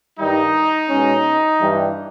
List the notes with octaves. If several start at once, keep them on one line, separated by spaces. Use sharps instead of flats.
G2 D#3 G3 D#4
B2 G#3 C#4
G2 E3 G3